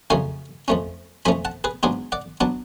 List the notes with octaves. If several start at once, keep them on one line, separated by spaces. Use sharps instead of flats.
F2 C#3 F#3 A3 C#4 F5 G#5
F2 F3 A3 C#4
F2 F3 A3 C#4 G#5 B5
F#5 A5
G#4 B4
G#2 F#3 B3 D4 F4 G#4
D5 F#5
F#3 B3 D4 F#5 A5